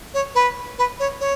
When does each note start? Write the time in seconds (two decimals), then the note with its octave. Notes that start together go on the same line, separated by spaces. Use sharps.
0.14 C#5
0.35 B4
0.78 B4
1.00 C#5
1.20 C#5